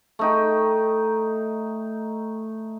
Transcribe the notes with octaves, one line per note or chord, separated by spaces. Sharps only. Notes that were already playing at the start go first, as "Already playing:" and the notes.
A3 D#4 G5